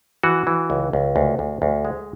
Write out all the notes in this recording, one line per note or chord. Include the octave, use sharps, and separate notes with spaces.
E3 F#4
E3
C#2
C#2
D2
D2
D2
G#3